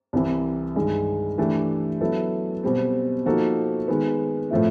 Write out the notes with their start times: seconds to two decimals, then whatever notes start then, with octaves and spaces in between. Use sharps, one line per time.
0.13 C2 C3 E3
0.76 G2 D#3 G#3
1.38 E3 A3 D4 G4
2.01 F#3 B3 E4 A4
2.63 B2 G3 C4
3.25 F3 A#3 D#4 F#4 A4
3.88 D#3 G#3 B3
4.51 A2 F3 A3 C4 E4